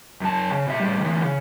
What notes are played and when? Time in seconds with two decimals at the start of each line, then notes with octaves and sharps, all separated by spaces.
0.21 F#2 A5
0.52 C#3
0.67 B2 E5
0.80 A2 G3
1.00 D2 E3
1.23 C#3